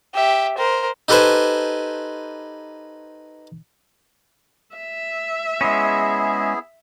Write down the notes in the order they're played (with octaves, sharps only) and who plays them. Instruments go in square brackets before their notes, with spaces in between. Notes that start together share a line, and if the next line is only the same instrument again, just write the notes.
[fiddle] G4 E5
A#4 C5
[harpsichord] D#4 G4 A4 B4 C5 G#5
[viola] E5
[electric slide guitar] G#3 C#4 [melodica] B3 E4 G#4